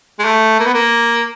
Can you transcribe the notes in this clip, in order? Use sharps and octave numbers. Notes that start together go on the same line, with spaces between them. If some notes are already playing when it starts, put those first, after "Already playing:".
G#3
A3
A#3
B3
A#3